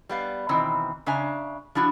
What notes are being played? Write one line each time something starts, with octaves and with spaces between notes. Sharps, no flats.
G3 B3 F5
B2 D#3 E3 C4
C#3 D4 E5 G#5 A#5
F3 D4 E4 F#4